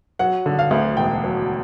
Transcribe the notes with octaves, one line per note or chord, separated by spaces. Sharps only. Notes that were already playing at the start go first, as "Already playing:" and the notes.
F#3 F#5
D3
F5
D2
E1 G5
F#3